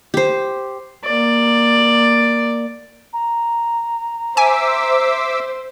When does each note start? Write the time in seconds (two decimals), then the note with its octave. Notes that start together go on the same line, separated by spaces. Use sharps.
0.14 G4 C5
1.05 A#3 D5
3.13 A#5
4.37 C5 E5 G#5 D6 E6